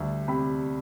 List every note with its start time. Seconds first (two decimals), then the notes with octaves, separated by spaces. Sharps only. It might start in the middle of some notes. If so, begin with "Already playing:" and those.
Already playing: D2 G3
0.28 C3 B5